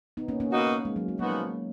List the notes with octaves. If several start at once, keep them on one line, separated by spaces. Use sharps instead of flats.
B3 D#4
A#3 C#4
A#3 C#4
B2 A#3 D#4 F#4
G#3
F#3
G#3
A#2 F3 F#3 A#3 B3 D#4 F#4